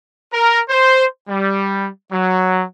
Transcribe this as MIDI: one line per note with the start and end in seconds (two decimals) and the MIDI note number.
0.33 0.60 70
0.69 1.05 72
1.28 1.87 55
2.12 2.63 54